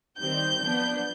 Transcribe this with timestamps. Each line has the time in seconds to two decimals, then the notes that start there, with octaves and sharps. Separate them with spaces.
0.19 D#3 G3 C4 G6
0.62 F3 B3 D4